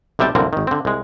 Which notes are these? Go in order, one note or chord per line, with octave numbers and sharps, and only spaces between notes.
B1 C3 G3 E5 G5 A5
C2 F#2 D3 G3 A#3 C4
G#1 D#3
D3 C4
C2 G#3